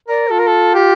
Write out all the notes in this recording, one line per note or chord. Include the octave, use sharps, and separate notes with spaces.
A#4 D5
F4 A4
A#4
A4
G4